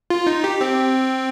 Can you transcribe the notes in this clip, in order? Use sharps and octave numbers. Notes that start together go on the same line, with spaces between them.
F4
D#4
G4
C4